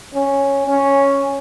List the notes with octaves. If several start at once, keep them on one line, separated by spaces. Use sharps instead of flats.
C#4
C#4